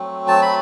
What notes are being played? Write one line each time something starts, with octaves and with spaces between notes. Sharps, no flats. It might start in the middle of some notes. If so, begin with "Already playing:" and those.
Already playing: F#3 A3 C4
A5
B5